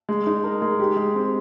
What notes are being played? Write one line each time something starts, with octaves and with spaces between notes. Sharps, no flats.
G#3
D#4
A#4
G#3
G4
G#3
C4